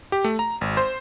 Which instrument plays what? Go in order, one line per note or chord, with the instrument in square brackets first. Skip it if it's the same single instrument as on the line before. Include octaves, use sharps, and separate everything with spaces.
[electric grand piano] G4
A3
A#5
G#1
C5